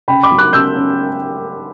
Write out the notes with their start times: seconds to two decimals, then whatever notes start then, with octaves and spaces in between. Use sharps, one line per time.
0.08 C#3 G5 B5
0.23 B5 D6
0.32 F#3
0.38 D6 F#6
0.53 C#3 E6 G6
0.76 C#4